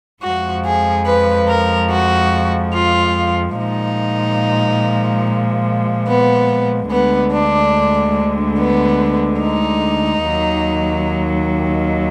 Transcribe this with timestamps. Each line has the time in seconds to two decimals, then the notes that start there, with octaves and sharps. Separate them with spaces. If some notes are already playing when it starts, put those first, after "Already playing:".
0.23 F2 F3 G#3 F#4
0.64 G#4
1.06 B4
1.48 A#4
1.90 F#4
2.73 F4
3.56 A#2 F3 G#3 D#4
6.06 B3
6.90 D2 D3 G#3 B3
7.31 D4
8.57 B3
9.40 D#4
10.24 D#2 D#3 F#3